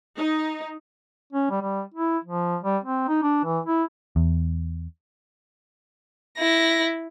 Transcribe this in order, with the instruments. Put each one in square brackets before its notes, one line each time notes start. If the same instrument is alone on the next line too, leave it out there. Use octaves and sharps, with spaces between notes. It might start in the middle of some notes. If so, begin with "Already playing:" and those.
[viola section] D#4
[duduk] C#4
G3
G3
E4
F3
G3
C4
D#4
D4
E3
E4
[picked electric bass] E2
[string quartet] E4 A#6